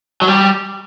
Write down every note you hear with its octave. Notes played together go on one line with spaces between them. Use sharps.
F#3
G3